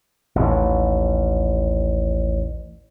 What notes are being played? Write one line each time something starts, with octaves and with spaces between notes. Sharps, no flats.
A1 D#2